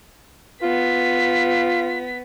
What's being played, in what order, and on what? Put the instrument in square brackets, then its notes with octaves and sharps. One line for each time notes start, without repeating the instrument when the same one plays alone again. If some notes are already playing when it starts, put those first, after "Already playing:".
[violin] B3 B6 [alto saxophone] F4